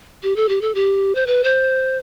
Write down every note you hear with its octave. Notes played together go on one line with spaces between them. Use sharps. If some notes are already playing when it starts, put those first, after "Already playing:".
G4
A4
G4
A4
G4
C5
B4
C5